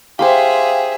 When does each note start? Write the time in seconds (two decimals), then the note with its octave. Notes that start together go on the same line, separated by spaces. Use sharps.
0.19 G4 G#4 C5 E5 F5 G5